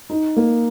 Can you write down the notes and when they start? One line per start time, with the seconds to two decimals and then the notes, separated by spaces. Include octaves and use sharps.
0.10 D#4
0.36 A#3